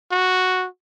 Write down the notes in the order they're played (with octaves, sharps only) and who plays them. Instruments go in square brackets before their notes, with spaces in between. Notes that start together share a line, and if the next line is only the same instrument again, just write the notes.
[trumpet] F#4